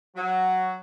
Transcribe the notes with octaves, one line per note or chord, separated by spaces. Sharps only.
F#3